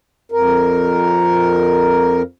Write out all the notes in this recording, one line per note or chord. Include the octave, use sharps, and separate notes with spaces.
F2 A#4